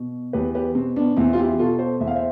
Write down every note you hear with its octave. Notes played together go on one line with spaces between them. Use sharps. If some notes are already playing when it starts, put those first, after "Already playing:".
Already playing: B2
E2 G4 B4
G4 B4
B2 C4
B3 D4
E2 C4 E4
F4
E4 G4
B2 F4 A4
A4 C5
E2 E5
F5
C5 E5